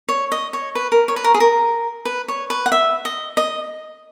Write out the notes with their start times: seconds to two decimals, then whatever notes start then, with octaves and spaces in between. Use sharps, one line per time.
0.09 C#5
0.32 D#5
0.53 C#5
0.75 B4
0.92 A#4
1.08 C#5
1.16 B4
1.24 A#4
1.34 G#4
1.40 A#4
2.05 B4
2.28 C#5
2.50 B4
2.66 F#5
2.72 E5
3.05 D#5
3.37 D#5